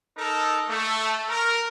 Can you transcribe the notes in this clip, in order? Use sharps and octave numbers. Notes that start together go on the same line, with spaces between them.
D#4 A4 A#4
A3
A#4